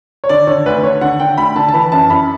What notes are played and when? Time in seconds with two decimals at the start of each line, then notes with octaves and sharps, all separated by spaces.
0.24 C#5
0.29 D3 D5
0.47 D3 C#5
0.66 D2 B4
0.83 D3 C#5
1.01 D3 F#5
1.20 D3 G5
1.38 D2 B5
1.55 D3 A5
1.68 A5
1.73 E3 B5
1.92 F#2 A5
2.10 F#2 B5